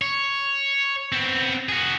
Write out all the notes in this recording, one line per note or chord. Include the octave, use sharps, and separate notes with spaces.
C#5
B3 C4
F#4 G#4